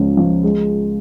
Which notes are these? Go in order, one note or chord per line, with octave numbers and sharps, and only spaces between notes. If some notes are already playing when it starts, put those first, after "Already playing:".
Already playing: C#2 C#3 F3
F3
G#3